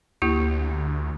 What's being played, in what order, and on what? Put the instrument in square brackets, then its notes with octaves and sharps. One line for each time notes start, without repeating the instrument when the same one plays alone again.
[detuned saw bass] D2 [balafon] A#3 E4 G4